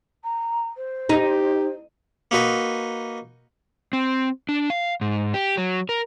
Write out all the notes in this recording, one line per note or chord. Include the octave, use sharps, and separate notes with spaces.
A#5
C5
D#4 G4
A#3 D#4 F#4 B4 D#5
C4
D4
F5
G#2
G4
F#3
A#4